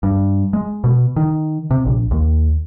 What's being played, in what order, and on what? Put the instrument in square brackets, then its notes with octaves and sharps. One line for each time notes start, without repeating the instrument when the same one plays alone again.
[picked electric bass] G2
G#3
B2
D#3
C3
A#1
D#2